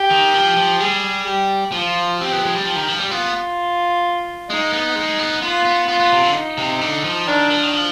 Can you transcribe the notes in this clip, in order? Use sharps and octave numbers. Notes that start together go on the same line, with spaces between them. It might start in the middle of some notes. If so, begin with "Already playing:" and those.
Already playing: G4
D#3
F3
F3
G3 G#4
G4
F3 F4
C4 G4
B3
G#3
G3
F3 G4
D#3
F3
G3
B3 F4
G#3 D#4
B3
G#3
B3
B3 F4
B3
B3 F4
B3
C3
D3
D#4
C3
D3
F3
D#3 D4
F3
D#3
F3